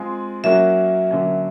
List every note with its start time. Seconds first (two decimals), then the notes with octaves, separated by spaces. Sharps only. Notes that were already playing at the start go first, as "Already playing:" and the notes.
Already playing: G#3 C4 F4 G#4
0.44 F#3 A#3 C#4 F#4 A#4 E5
1.11 D3 F#3 A#3 C#4